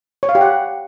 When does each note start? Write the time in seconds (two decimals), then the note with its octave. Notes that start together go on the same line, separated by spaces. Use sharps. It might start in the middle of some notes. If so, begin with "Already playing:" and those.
0.23 C#5
0.29 F5
0.35 G4
0.41 F#5